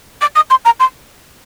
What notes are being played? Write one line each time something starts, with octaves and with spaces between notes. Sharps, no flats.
D6
D#6
C6
A#5
C6